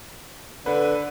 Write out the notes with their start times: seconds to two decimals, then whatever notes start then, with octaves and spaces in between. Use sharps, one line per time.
0.66 D3 B4